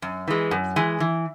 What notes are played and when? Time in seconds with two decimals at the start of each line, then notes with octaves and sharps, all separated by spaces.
0.02 F#2
0.28 E3 G#3
0.51 F#2
0.76 E3 G#3
1.00 E3